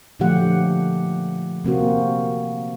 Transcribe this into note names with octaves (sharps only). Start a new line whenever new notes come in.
A#2 D3 F3 A3 G4 F#5
C3 A#3 C4 F#4